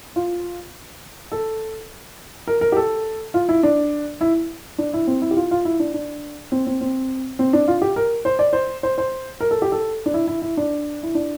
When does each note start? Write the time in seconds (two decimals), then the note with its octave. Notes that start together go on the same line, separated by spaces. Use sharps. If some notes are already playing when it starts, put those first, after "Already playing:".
0.16 F4
1.32 A4
2.47 A#4
2.61 A#4
2.72 G4
2.77 A4
3.34 F4
3.49 E4
3.63 D4
4.21 E4
4.78 D4
4.93 E4
5.07 C4
5.22 E4
5.31 G4
5.37 F4
5.51 F4
5.65 E4
5.80 D4
5.94 D4
6.52 C4
6.67 C4
6.81 C4
7.39 C4
7.53 D4
7.68 F4
7.82 G4
7.96 A#4
8.25 C5
8.39 D5
8.53 C5
8.83 C5
8.98 C5
9.40 A#4
9.51 A4
9.62 G4
9.72 A4
10.06 D4
10.14 E4
10.27 E4
10.42 E4
10.57 D4
11.03 E4
11.15 D4